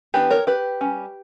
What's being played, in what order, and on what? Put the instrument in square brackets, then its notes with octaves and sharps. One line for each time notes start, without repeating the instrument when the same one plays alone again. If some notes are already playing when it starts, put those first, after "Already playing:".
[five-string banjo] E3 B3 D4 G4 B4
A#4 C#5
G4 B4
G3 C#4